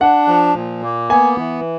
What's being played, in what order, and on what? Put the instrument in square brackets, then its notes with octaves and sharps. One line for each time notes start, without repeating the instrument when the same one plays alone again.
[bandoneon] D4 [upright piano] F#5
[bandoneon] F3
A#2
A#3
[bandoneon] B3 [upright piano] G#5
[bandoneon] E3